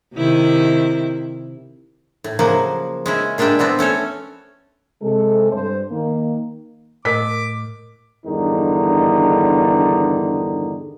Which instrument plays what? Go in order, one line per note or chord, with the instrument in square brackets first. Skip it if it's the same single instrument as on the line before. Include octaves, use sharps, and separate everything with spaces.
[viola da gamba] C3 D#3 E4
[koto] A2
C#3 F3 F#3 A#3
G#3 C#4 E4
A#2 G#3 D4 E5 G5
B3 C4 D4 E4
A3 C#4 A4 C#5
[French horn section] C3 G#3 A4
G2 C5
D#3 A#3
[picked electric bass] A2 [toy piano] A#4 D#5 [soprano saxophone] D6 [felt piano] B6
[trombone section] E2 G2 D3 D#3 D#4